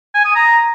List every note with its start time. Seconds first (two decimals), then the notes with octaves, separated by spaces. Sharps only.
0.15 G#5
0.25 D#6
0.35 A#5